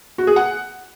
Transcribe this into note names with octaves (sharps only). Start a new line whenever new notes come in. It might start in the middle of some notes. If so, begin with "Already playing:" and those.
F#4
G#4
F#5